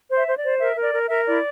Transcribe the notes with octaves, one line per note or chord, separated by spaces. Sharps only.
C5
E5
C5
D5
C5
A#4 E5
A#4
D5
A#4
A#4 E5
E4 D5